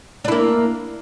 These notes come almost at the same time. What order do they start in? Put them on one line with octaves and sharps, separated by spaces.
D4 E4 A#3